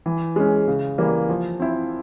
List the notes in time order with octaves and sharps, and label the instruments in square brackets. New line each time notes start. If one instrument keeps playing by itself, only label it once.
[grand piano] E3
G#3 C#4
C#3
E3 G3 A#3
F3
C4 E4